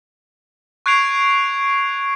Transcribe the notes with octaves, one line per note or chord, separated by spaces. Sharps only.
C#6 F#6 G#6 C7 D7 F7